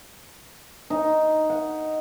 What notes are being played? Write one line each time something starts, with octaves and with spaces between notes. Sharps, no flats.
D#4
F#5